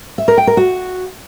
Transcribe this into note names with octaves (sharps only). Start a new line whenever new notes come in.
E5
A#4
G5
A#4
F#4